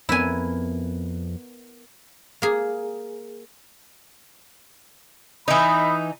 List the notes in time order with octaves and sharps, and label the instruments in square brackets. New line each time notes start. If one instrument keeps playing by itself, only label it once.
[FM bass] F2 [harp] B3 A#4 B4 [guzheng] E4 G#5
[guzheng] A#3 G#4
[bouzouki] E3 D#4 [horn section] D#5 E5 B5